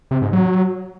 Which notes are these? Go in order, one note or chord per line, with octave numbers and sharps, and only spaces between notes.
C3
G#2
F#3